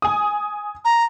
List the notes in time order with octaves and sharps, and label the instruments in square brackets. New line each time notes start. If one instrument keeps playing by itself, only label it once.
[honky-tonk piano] G#5 D#6
[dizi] A#5